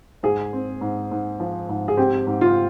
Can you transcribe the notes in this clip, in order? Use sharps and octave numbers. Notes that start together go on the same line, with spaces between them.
G#2 G#4
C4
G#2
G#2
F3
G#2
G#4
C4 G4
G#2
F4